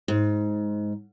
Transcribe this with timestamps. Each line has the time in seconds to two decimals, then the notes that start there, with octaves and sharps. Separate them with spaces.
0.08 G#2